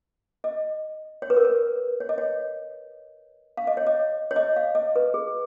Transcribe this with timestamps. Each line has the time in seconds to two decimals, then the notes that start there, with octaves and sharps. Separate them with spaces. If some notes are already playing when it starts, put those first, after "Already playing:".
0.44 D#5
1.22 C#5
1.30 B4
1.37 A#4
1.45 B4
2.00 C#5
2.09 D#5
2.18 C#5
3.57 F5
3.67 D#5
3.77 C#5
3.87 D#5
4.31 C#5
4.36 D#5
4.56 F5
4.75 D#5
4.96 B4
5.14 G#4